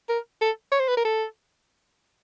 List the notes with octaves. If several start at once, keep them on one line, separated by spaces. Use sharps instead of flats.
A#4
A4
C#5
C5
B4
A#4
A4